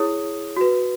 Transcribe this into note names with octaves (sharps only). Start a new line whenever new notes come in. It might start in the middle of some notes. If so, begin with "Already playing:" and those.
Already playing: E4 G#4 C#5 D#6
F#4 B4